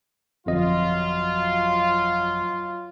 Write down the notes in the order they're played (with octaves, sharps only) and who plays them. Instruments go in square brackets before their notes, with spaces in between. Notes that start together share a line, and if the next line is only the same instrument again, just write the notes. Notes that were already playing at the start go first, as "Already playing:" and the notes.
[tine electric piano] G1 F2 D#5 [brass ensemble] F#3 F4